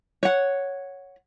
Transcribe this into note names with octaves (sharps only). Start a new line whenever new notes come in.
C#5 F#5